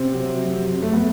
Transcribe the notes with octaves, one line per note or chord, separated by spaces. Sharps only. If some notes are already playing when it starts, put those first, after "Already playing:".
Already playing: C3 C4
F#3
F#2
F#2
A3
B3